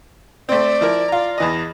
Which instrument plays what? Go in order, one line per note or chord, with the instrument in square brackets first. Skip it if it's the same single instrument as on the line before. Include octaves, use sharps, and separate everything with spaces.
[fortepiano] A3 C4 [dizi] D5
[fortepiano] F3 E4 A#4
F4 A#5
E2 E3 D#5